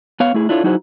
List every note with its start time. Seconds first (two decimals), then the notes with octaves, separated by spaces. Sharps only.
0.20 B3 C#5 F5
0.34 A3 E4 G#4
0.49 D4 E4 F4 A4 C#5
0.64 F#3 D#4 E4 F#4 G#4 C5